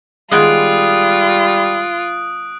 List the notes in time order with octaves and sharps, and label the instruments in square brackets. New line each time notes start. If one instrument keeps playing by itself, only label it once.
[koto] D#3 G#3 B3 [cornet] G3 [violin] F4 [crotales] D#6 F#6 D7